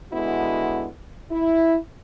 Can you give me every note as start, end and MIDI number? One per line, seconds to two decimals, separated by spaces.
0.12 0.87 50
0.12 0.87 56
0.12 0.87 59
0.12 0.87 64
0.12 0.87 66
1.31 1.77 64